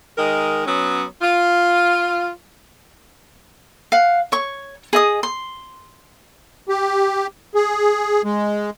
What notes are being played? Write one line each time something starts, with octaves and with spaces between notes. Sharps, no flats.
D#3 G#3 A#4
F#3 B3 C#4
F4
F5 F#5
C#5 C#6
G#4 D#5 D#6
C6
G4
G#4
G#3